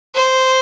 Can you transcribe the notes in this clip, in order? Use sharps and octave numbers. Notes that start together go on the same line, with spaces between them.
C5